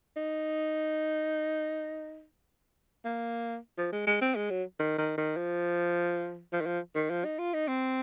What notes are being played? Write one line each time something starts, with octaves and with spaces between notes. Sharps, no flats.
D#4
A#3
F3
G#3
G#3
C4
G#3
F#3
D#3
D#3
D#3
F3
F3
D#3
F3
D#3
F3
D#4
F4
D#4
C4